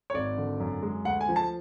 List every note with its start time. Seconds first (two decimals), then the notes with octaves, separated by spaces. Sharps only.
0.10 C#5
0.14 G#1 D5
0.38 D3
0.60 F#2
0.82 G#3
1.05 D2 F#5
1.21 G#5
1.29 F3
1.36 A5